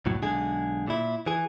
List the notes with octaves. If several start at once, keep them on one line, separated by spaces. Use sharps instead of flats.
C2 F2 A2 F#3
B1 D3 G#3 G#4
A#2 E4
E3 G#4